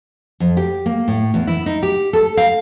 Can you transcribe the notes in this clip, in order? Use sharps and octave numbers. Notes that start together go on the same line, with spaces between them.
F2
G4
A#3
A2
E2
E4
D#4
G4
A4
F5